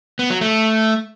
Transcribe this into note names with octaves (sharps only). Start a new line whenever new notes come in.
B3
F#3
A3